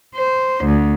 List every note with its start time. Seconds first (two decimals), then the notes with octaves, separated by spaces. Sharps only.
0.15 C5
0.65 D2